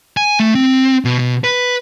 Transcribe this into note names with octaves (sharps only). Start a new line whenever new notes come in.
G#5
A3
C4
B2
B2
B4